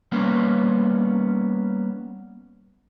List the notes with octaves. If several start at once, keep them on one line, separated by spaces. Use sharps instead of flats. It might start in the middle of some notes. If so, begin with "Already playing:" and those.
G3 A#3 B3 C#4